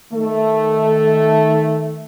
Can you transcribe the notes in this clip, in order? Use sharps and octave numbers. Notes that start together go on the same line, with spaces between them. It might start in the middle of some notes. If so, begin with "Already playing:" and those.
D#3 A3